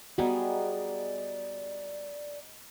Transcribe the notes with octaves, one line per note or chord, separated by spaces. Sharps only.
G3 B3 D#4 F#4 G#4 D5